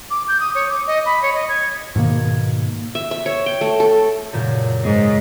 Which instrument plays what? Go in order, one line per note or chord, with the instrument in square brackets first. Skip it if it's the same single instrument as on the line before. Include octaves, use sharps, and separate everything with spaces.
[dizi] D6
G6
D#6
C#5
D6
D#5
B5
C#5
D#5
G#6
[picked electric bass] G#2 B2 D#3 A#3
[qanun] E5
E5
C#5
G5
A3
A4
[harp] F#2 A#2 C#3
[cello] G#2 [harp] G#4